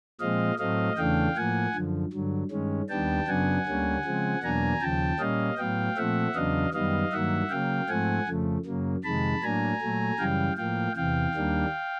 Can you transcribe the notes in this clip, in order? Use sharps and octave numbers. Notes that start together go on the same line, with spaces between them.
A#2 F3 G#3 C4 D#5 F5
A2 F#3 A3 C4 D#5 F5
E2 C#3 E3 A3 D4 F5 G5
A2 F3 A#3 F#5 G#5
F#2 D3 F3
G2 D3 F#3
G2 D#3 G#3 C#4
D#2 D#3 G3 B3 D4 G5 A5
F#2 C#3 F#3 B3 D4 F#5 G#5
D2 D3 G3 A#3 C#4
C#3 F3 G#3 C4
E2 B2 F#3 A#3 D4 G#5 A#5
D#2 C#3 F3 G5 A5
A#2 G3 A#3 C#4 D#5 F5
A2 F#3 B3 F5 G5
A#2 F3 A3 C4 E5 F#5
E2 C#3 F#3 B3 D4 D#5 F5
F#2 D#3 G3 B3 D#5 F5
G2 D#3 F#3 A#3 E5 F#5
C#3 F#3 A#3 F5 G5
G#2 F3 A3 C4 F#5 G#5
F2 C#3 F3 A3
F#2 C#3 F#3 A#3
F2 C3 D#3 G#3 A5 B5
A2 F#3 A#3 D4 G#5 A#5
A#2 F#3 A3
F#2 C#3 E3 G3 F5 G5
A2 F3 A#3 F5 G5
E2 C3 E3 F5 G5
D#2 D#3 G3 A#3 D4